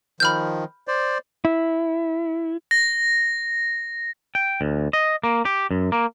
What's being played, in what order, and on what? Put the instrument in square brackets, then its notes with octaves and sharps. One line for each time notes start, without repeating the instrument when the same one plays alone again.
[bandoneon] D#3 F3 [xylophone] B5 F6 G6
[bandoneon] C5 D5
[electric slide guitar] E4
[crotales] A#6
[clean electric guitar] G5
D2
D#5
A#3
G4
F#2
A#3